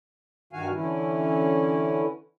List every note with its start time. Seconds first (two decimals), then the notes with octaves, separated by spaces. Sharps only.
0.53 G2 D#3 F#4 F5 G#5
0.74 D3 E3 C#4 E4